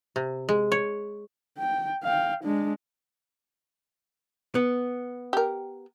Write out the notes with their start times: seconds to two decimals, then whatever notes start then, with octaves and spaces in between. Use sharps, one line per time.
0.16 C3
0.49 G#3
0.72 C#5
1.58 G5
2.04 F5 G5
2.44 G#3 D4
4.55 B3
5.33 G4 A#4